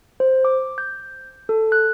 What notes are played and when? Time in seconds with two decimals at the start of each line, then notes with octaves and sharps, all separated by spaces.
0.20 C5
0.45 D6
0.78 G6
1.49 A4
1.72 F#6